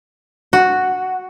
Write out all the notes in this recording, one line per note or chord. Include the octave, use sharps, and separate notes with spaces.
F#4